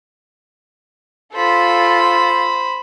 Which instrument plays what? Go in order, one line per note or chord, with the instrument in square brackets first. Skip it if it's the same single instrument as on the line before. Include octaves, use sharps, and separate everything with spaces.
[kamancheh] F4 A4 [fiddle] C5 B5